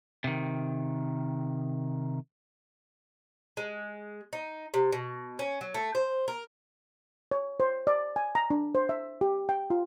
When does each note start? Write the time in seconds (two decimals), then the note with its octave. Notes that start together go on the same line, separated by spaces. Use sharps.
0.24 C3 D#3
3.57 G#3
4.33 D#4
4.74 C3
4.92 B2
5.39 C#4
5.61 F#3
5.74 A3
5.95 C5
6.28 A#4
7.31 C#5
7.60 C5
7.87 D5
8.16 G#5
8.35 A#5
8.50 D4
8.75 C5
8.89 E5
9.21 G4
9.49 G5
9.70 F4